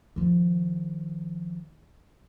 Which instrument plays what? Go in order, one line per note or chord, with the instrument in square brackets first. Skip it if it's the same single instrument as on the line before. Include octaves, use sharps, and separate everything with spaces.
[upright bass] D#3 F3